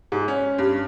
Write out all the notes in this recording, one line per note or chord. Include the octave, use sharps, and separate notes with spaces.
G#2
C#4
G2